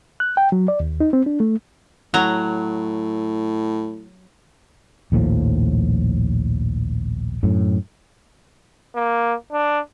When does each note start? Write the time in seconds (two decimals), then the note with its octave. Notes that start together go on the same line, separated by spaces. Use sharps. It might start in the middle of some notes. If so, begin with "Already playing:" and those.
0.20 F#6
0.37 G5
0.52 F#3
0.68 D5
0.80 D#2
1.00 D#4
1.13 C4
1.26 D4
1.40 A3
2.14 A2 F#3 A#5
5.12 A#1 D#2 A2 F3
7.43 F#2 A2
8.95 A#3
9.52 D4